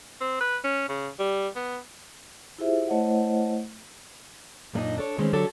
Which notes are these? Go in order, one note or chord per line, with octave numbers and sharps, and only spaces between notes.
C4
B4
C#4
C#3
G3
B3
E4 F4 G4 G#4 C5 E5
A3 E4 C5 C#5 D#5 F#5
F#2 A#2 A3 D4 D#4 D#5
D4 A4 C#5
D#3 E3 G#3 A3 C4 C#4
D3 F#3 D4 G4 A4 C#5